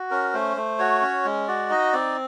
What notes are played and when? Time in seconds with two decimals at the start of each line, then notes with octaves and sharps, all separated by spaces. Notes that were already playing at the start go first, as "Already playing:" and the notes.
Already playing: F#4
0.11 C#4 A#4
0.33 A3 C5
0.57 A3
0.79 F#4 C#5
1.01 C#4
1.25 G#3
1.48 F#4 D5
1.70 D#4 D#5
1.93 C4 D5